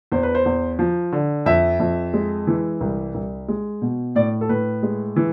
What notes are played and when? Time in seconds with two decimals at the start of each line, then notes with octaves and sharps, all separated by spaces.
0.12 E2 C5
0.23 B4
0.35 C5
0.46 E2
0.79 F3
1.12 D3
1.46 F2 E5
1.80 F2
2.14 G#3
2.47 E3
2.81 C2
3.14 C2
3.48 G#3
3.82 B2
4.15 A2 D5
4.41 A4
4.49 A2 B4
4.83 G#3
5.16 E3